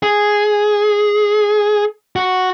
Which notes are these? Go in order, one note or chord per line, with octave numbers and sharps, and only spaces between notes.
G#4
F#4